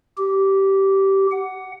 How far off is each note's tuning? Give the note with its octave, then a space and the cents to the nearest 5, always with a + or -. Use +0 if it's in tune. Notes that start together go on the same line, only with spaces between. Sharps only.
G4 -15
F#5 +10